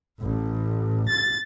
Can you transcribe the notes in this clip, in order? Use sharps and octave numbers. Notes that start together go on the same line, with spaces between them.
A1
A6